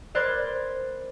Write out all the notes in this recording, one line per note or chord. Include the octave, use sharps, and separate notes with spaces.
A#4 C5 D5 B5 F#6 G#6